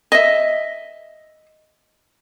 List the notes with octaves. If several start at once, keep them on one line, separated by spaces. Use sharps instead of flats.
D#5 E5